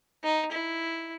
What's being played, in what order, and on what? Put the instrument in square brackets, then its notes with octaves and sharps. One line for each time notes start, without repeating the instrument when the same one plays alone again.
[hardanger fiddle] D#4
E4